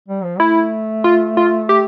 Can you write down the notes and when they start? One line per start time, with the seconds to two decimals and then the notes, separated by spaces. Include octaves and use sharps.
0.08 G3
0.23 F3
0.40 A3 E4
1.04 F4
1.37 F4
1.69 G4